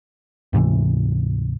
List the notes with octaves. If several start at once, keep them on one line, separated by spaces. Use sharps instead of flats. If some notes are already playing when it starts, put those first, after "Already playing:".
D2 G#2 C3 E3